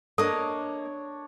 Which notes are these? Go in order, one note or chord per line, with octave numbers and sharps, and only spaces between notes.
A#3 D4 A4 C#5 D#5